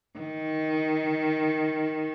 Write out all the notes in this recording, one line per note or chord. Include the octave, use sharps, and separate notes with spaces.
D#3